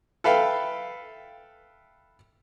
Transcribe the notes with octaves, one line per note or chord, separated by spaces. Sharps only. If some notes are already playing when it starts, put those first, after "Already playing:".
A4 B4 E5 F5 G5